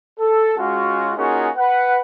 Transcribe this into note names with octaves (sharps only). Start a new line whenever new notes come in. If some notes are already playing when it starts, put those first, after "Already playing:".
A4
G#3 C#4 F4 F#4
A#3 C#4 D#4 F4 F#4 G#4
B4 F#5